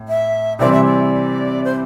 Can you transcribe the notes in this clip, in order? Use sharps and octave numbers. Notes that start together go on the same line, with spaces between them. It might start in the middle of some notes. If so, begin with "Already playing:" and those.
Already playing: A2
E5
C3 E3 G3 C4 E4 D5
E5
D5
C5